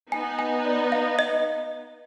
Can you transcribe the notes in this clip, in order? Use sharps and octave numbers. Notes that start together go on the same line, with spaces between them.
B3 D#4 G#5
G#5
D5
F5
D#5